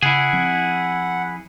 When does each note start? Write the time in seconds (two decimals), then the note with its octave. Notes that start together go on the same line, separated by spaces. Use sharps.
0.03 C#3 E4 G#4 F#5
0.33 F3 C4